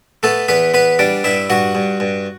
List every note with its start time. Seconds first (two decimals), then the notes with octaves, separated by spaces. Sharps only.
0.23 A3 B3 A4
0.48 E2 B3 B4
0.74 B3 B4
0.99 G3 D4 D5
1.24 G2 E4 E5
1.50 G2 F#4 F#5
1.75 G2
2.00 G2